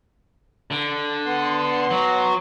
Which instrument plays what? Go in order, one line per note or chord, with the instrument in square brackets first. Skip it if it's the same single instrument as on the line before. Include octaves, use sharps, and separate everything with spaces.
[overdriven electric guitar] D3
[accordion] B3 C6
[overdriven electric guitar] F#3